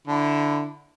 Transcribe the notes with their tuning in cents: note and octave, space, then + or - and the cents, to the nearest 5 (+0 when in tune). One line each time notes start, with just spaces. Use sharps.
D3 +0 E4 +0